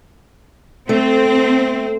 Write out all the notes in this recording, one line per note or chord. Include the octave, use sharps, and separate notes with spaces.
A3 C4